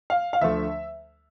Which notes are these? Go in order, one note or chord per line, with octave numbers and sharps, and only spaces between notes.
F5
F5
D2 D3 F3 A3 E5